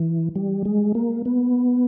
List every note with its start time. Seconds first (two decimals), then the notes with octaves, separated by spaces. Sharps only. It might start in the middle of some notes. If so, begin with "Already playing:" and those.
Already playing: E3
0.35 G3
0.65 G#3
0.95 A#3
1.25 B3